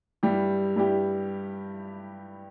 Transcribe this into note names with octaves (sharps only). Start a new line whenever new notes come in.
G2 G3 E4 G4
G2 G3 E4 G4